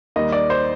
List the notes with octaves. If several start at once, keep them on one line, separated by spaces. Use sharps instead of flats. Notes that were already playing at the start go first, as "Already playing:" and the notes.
D#2 D#3 G3 D#5
D5
C5